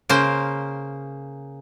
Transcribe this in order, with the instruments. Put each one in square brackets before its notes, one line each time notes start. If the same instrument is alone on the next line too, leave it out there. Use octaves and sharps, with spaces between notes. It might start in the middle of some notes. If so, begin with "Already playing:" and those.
[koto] C#3 A#3 C5